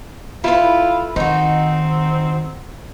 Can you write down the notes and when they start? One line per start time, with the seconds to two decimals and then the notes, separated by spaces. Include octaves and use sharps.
0.44 E4 F4 A4 B4
1.16 D#3 C4 D#4 F#4